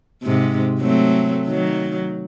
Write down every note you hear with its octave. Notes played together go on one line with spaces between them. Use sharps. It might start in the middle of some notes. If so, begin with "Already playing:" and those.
G#2 C3
F#3 A3 C4
D#3 F#3